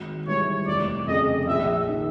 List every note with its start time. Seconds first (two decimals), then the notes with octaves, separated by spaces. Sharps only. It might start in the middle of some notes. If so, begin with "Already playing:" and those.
Already playing: G#1
0.27 G#2 E3 G3 C#5
0.67 F1 D5
1.07 F2 C#3 D#5
1.47 A#1 E5
1.89 D#3